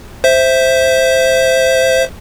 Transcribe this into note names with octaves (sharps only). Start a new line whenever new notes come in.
C5 E5